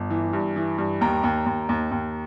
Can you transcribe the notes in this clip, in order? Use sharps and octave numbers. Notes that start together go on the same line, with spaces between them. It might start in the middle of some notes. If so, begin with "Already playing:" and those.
Already playing: G1
E3
G2
E3
G2
D#2 G5 A#5
D#2
D#2
D#2
D#2